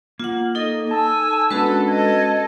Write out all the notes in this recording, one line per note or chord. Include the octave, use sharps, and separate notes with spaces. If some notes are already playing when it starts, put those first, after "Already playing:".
A#3 F4 F#5
D#4 A4 D#5
G#5 A5 E6
G#3 B3 C#4 D4 F#4 A4 B4
A4 D#5 G#6